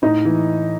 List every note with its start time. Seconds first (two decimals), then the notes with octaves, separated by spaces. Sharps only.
0.02 A2 D#4
0.25 E3